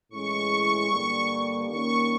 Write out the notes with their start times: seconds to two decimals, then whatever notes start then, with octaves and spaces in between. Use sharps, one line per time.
0.10 A2 E3 G#3 C#4 C#6
0.90 G2 D3 G3 A#3 D4
1.69 D#3 G3 A#3 C#4 C#6